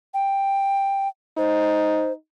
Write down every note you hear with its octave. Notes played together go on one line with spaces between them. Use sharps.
G5
D#4 C5